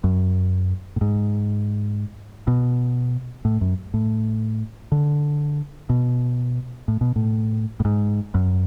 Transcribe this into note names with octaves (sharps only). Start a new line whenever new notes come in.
F#2
A2
G#2
B2
A2
F#2
A2
D3
B2
A2
B2
A2
A2
G#2
F#2